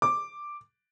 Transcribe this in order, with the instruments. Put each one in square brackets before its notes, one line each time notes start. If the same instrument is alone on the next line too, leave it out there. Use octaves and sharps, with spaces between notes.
[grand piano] D6